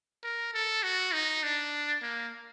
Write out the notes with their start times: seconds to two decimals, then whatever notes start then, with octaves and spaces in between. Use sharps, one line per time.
0.23 A#4
0.54 A4
0.83 F#4
1.13 D#4
1.43 D4
2.02 A#3